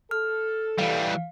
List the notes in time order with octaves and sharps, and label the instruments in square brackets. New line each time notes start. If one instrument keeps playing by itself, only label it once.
[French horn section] A4 [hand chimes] F6
[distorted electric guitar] E3 G3 [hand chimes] F5